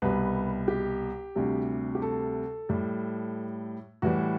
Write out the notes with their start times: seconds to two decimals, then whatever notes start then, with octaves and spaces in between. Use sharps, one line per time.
0.02 C2 B2 G3 B4
0.68 G4
1.36 D2 C3 G3
1.95 G4
2.02 A4
2.69 A2 G3
4.02 A2 E3 G3 F#4